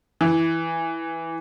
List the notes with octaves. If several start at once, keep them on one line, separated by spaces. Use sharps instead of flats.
E3